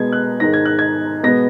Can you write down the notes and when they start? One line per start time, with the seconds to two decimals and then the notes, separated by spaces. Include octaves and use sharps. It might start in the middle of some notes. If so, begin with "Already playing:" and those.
Already playing: B2 G#3 B3 G#6
0.12 F#6
0.40 G#2 D#3 G#3 A#6
0.53 G#6
0.65 F#6
0.79 G#6
1.23 B2 G#3 B3 A#6